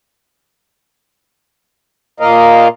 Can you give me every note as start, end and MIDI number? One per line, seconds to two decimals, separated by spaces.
2.20 2.68 46
2.20 2.68 58
2.20 2.68 70
2.20 2.68 75
2.20 2.68 77